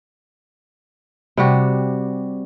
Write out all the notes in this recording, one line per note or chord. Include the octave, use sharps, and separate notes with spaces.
C3 G3 F#4